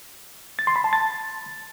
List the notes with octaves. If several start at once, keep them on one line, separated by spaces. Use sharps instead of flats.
A6
C6
B5
A5
A6